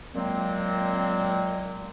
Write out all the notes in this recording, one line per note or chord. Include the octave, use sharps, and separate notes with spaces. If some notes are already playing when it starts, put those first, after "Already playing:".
A#2 F#3 G#3 A#3 C4